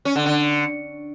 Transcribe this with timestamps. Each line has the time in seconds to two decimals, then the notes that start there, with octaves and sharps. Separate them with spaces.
0.05 C#4
0.16 D3
0.26 D3